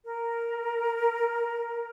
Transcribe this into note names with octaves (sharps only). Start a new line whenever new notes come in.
A#4